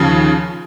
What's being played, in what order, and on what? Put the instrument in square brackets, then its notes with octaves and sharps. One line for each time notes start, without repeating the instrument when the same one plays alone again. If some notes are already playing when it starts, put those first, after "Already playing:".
Already playing: [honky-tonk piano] D#2 C#3 F3